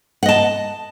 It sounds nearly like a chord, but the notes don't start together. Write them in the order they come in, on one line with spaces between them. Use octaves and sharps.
F#5 D#5 A5